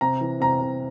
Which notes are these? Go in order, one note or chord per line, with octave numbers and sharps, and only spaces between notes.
C3 A#5
E3
C3 A#5
C3